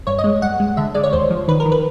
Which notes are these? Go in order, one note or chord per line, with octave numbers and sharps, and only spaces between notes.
G2 C#5
D#5
G#3
G2 F#5
G#3
D3 E5
G#3 D5
C#5
D#2 C5
F3
D#3 B4
A#4
D#3
B4